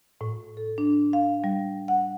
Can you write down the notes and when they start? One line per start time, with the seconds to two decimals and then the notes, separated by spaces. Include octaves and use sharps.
0.21 A2
0.57 A4
0.78 D4
1.13 F5
1.44 G3
1.88 F#5